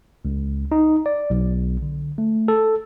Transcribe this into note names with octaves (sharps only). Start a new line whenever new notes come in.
C#2
D#4
D5
B1
D3
A3
A4